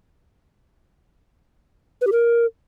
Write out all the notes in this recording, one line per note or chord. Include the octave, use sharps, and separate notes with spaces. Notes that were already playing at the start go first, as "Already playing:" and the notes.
B4
G4
A#4